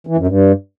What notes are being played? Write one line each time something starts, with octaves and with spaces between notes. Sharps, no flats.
E3
F#2
G2